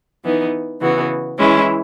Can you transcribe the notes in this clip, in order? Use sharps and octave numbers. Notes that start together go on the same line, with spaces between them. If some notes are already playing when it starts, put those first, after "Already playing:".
E3 B3 D#4
C#3 E3 B3 F#4
E3 G#3 C#4 E4